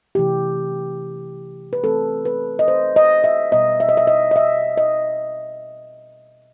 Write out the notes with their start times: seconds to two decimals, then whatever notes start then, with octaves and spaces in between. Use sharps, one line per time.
0.15 C3 E3 A3 G4
1.73 B4
1.84 E3 A3 C4 A4
2.25 B4
2.59 D#5
2.68 C5
2.96 D#5
3.24 E5
3.52 B2 G3 B3 D#5
3.80 E5
3.89 D#5
3.97 E5
4.07 D#5
4.31 D#5
4.36 E5
4.78 D#5